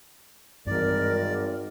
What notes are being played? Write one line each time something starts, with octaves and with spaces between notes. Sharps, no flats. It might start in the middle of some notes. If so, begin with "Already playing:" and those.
G#1 G2 E3 A#4 D5